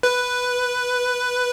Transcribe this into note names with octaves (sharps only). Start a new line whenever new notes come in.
B4